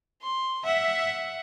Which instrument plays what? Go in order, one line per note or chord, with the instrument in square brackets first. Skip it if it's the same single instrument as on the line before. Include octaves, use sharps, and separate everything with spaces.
[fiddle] C6
[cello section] E5 [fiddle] F#5